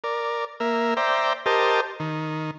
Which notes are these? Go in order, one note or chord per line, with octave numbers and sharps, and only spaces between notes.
A#4 D5
A#3 A#4 E5
C5 D5 E5 G5 A#5
G4 A#4 C5 D#5 A5
D#3